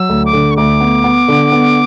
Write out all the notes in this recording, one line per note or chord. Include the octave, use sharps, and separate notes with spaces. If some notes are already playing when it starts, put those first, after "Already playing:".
Already playing: F#3 E6
D2
D6
D3
C#6
D2 D6
B3
B3
D3
B3